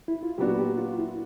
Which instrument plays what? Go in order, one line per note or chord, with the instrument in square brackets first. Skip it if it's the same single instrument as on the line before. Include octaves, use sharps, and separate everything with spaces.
[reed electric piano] E4
F4
[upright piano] A#2 F#3 B3 D4 F#4 [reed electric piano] G4
[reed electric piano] G4
F4
E4